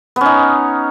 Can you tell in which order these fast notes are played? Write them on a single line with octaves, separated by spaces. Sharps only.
B3 C#4 D#4